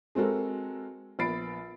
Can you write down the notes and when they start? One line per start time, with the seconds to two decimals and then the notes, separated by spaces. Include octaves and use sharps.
0.15 G#3 C4 F#4 A4 A#4
1.19 A#1 B3 B5 A6 C7 D7